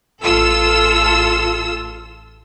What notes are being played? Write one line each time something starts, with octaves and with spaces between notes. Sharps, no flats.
A1 F4 A4 E6